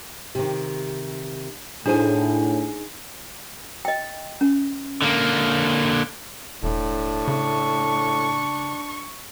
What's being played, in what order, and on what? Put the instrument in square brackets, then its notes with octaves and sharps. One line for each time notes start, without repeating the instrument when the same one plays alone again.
[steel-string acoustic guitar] C3 D#3 [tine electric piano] G4
[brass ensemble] A2 [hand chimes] D4 [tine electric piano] D#4 [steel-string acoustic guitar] G#4 C5 G#5
[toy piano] D#5 G5
C#4
[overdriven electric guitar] D3 A#3
[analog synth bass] E1 [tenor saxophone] A2 [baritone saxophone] D4
[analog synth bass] C#3 [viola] C#6